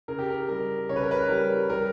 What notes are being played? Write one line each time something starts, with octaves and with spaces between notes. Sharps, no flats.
C#3 A#4
G4
A#4
G3 A#4
C#3 C#5
B4
A#4
B4
G3 A#4
G3 A#4